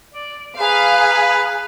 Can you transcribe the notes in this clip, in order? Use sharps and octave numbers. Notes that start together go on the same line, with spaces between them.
D5
G#4 B4 F5 A#5